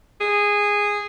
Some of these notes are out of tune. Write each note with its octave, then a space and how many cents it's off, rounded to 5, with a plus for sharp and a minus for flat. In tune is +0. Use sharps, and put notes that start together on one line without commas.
G#4 -10